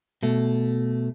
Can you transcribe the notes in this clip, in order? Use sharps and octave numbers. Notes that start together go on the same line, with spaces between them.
B2 A3